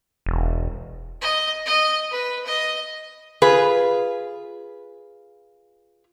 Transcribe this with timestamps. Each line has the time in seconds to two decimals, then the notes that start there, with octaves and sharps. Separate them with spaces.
0.26 E1
1.21 D#5
1.66 D#5
2.11 B4
2.46 D#5
3.42 F4 G#4 B4